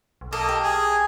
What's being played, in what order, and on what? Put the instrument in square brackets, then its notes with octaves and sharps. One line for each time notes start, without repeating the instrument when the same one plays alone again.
[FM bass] B1
[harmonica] A#3 D#5 [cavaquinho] A4
[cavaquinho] G4
[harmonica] G#4 [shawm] G#5